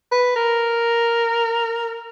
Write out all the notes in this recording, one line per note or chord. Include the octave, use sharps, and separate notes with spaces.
B4
A#4